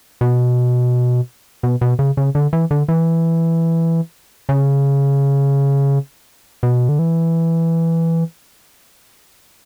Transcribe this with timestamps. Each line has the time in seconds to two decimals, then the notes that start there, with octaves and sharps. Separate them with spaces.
0.21 B2
1.63 B2
1.81 B2
1.99 C#3
2.17 C#3
2.35 D3
2.53 E3
2.71 D3
2.88 E3
4.49 C#3
6.63 B2
6.89 D3
6.99 E3